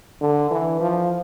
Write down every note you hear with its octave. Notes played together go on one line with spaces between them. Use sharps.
D3
E3
F3